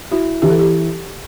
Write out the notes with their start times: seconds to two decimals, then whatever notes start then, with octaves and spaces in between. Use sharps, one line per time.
0.11 E4 F#4
0.42 E3 G4
0.50 A4
0.59 G4